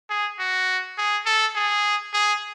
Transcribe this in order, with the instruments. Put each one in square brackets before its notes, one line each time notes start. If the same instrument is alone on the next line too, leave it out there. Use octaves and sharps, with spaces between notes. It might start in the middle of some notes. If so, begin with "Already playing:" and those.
[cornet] G#4
F#4
G#4
A4
G#4
G#4